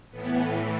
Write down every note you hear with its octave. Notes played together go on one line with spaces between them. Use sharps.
A2 E3 B3